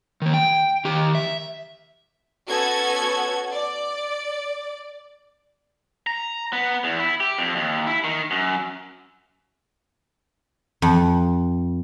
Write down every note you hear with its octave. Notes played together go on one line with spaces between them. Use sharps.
D#3 A#3
G5
D#3 G4
E5
B3 C#4 F#4 A4 G#6
D5
A#5
B3
E2
E4
G4
F2
D#2
E4
D#3
F#2
F2